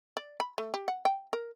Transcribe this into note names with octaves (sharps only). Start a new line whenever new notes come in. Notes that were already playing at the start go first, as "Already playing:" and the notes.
D5
B5
A3
G4
F#5
G5
A#4